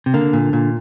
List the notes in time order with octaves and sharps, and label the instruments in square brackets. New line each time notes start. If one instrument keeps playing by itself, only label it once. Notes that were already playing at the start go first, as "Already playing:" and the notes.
[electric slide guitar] C3
[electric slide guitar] D3 [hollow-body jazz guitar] A#3
[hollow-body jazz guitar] A#2
A#2